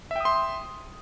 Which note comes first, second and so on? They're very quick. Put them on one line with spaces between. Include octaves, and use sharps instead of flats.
E5 G5 D#6 C6